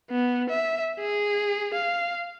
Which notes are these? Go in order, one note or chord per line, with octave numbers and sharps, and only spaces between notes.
B3
E5
G#4
F5